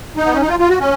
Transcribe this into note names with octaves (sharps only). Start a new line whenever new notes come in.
D#4
B3
C#4
D#4
F4
F4
F#4
C#4